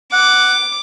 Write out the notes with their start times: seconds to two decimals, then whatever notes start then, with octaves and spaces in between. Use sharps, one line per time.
0.13 F#5 D6